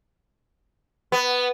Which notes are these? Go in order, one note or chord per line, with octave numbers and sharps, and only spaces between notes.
B3